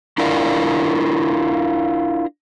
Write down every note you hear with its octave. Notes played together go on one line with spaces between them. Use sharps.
D4 E4 F4 A#4 D5